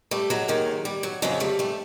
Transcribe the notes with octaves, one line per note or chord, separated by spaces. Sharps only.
G3 A3
F#3 G#3
D#2 D#3 F#3
G3
F#3
F2 C#3 F3 F#3 G#3
G3 A3
G3 A3